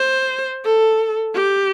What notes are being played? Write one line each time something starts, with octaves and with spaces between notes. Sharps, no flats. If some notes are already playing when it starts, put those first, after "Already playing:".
Already playing: C5
A4
G4